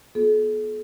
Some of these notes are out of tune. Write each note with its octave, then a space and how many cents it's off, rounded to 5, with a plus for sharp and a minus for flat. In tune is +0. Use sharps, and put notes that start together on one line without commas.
B3 -30 F4 +35 A4 -45